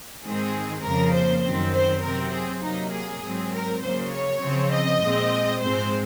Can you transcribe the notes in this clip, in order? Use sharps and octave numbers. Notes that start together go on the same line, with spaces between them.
G#2 D#3 G#3 C4 G#4
F2 C#3 F3 A#3 A#4
C5
F#2 D#3 F#3 C4
C5
C3 F#3 C4 A#4
G#4
C3 F#3 A#3 D#4
G#4
G#2 F#3 C4
A#4
C#3 F#3 A#3 C5
C#5
C#3 F3 C4
D#5
A#2 G#3 C4
G#2 F3 G#3 C4 C5